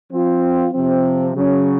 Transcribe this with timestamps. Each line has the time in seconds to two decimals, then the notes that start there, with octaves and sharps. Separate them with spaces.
0.11 F3 C4 F4
0.72 C3 F3 C4
1.34 C#3 F#3 C#4